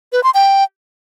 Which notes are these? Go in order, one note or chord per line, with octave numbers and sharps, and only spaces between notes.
B4
C6
G5